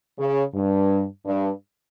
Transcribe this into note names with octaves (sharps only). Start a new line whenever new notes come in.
C#3
G2
G2